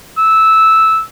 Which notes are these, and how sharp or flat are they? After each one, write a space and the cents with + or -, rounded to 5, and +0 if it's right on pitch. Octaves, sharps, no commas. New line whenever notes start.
E6 -10